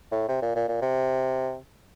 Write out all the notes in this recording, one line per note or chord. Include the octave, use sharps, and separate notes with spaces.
A2
C3
A#2
A#2
A#2
C3